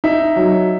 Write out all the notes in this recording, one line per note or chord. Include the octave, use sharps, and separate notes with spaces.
D#4 E5
F#3